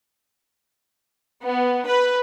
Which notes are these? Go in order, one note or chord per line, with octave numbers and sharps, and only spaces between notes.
B3
B4